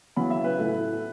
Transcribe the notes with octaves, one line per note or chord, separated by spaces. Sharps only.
C#3 F#3 B3 E4 B5
E5
B4
A2 A3 E4